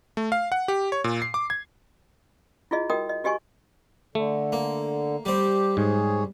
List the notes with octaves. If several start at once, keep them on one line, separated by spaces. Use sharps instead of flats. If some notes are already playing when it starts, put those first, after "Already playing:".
A3
F5
F#5
G4
C#5
A#2
C7
D6
G#6
E4 F4 G#4 D#5
F#4 A#4 D#5 G5 D#6
D#5
F#4 G4 D#5 G#5 C#6
D3 A3
A#3
G3 C4 G4
G#2 G#4 C#5